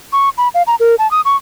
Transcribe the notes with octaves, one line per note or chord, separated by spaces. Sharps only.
C#6
B5
F5
A#5
A#4
A5
D#6
C#6